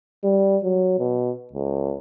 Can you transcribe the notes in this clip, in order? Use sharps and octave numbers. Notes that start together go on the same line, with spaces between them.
G3
F#3
B2
C#2